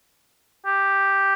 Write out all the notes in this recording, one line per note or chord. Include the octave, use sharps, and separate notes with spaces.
G4